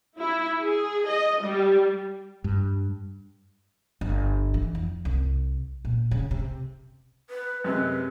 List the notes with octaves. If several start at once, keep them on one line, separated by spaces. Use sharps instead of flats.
E4
G#4
D#5
G3
G2
G1
E3
F2
C2
A#2
C#3
C3
B4
F#2 C3 G#3 B4